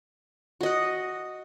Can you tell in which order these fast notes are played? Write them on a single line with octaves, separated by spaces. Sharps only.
F#4 D#5 F#5